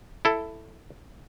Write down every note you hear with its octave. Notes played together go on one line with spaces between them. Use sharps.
E4 A4